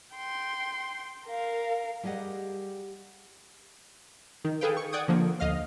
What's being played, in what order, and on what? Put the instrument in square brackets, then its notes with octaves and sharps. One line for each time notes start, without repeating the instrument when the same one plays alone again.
[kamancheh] G5 C6
A#4 F5
[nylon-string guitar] G3 G4 G#4 D#5 F#5
[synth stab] D#3
G#4 A4 B4 F5 G5
C#6
D5 F#5 G5 D#6 G#6
D3 F3 A#3
D2 D#5 F5 F6